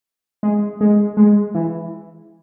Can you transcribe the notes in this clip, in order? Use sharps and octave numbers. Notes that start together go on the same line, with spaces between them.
G#3
G#3
G#3
E3